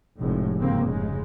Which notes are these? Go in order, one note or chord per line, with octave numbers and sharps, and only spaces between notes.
F1 A2 G#3
G#1 C#3 A#3 C4
F1 G#2 C#3 G#3